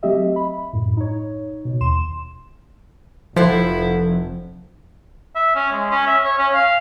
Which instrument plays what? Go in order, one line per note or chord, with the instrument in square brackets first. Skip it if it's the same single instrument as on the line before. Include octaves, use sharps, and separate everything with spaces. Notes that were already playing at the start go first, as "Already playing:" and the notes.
[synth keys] F#3 A3 C4 G4 D#5 E5
B5
F#2 A2
D#4 C#5
B2
D#2 C6 E7
[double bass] F1 F2 [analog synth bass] F3 [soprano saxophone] E4 [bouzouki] A4 C5 F#5
[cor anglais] E5
C#4
G#3
C#4
E5
C#5
C#4
F5